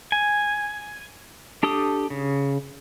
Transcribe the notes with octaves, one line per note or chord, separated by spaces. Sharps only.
G#5
D4 G4 A4 D#6
C#3